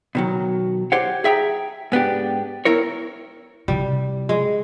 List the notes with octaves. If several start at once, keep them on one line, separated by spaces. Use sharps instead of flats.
B2 D#3 F#3
G4 C5 C#5 F#5
G#4 E5 G5 A#5
G#2 B3 D4 G4
B3 E4 A#4 C#5
C3 G3 E4
G#3